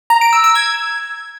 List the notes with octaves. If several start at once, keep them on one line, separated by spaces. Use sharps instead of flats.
A#5
D7
E6
E6
G#6